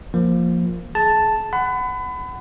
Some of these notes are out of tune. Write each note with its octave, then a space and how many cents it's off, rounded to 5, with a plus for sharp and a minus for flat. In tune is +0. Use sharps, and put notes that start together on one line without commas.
F3 +0 A#3 +0
G#4 +30 A5 +0
F#5 +10 B5 +30